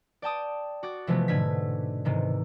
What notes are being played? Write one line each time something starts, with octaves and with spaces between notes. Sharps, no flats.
D5 G5 A5 D#6
F#4 D6 A6
C3 E3 F3 G#3 A3 B3
G#2 B2 D3 A3 G#6 B6
G#2 C3 D#3 E3